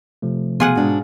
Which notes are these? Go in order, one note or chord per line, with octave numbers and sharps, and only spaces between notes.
C3 F3 A3
B2 F4 G#4 F#5 G#5
G#2 D4 F#4